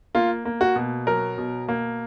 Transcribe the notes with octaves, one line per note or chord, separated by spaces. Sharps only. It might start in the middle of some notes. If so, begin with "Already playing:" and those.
A#3 F4
A#3
F#4
B2
F#3 A#4
B2
A#3